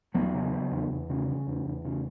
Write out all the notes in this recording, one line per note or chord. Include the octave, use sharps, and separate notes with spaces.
E2 F#3 B3
C#3
C#3
E2
E2
C#3
C#3
E2
E2
C#3